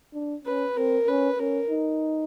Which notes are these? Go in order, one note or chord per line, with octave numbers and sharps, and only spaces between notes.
D4
C#4 B4
C4 A#4
C#4 B4
C#4 A#4
D#4